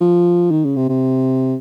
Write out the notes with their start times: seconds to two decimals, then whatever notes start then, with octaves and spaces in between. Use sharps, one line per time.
0.01 F3
0.51 D#3
0.65 C#3
0.77 C3
0.89 C3